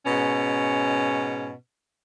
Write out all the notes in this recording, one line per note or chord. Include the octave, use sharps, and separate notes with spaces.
G#2 B2 C#4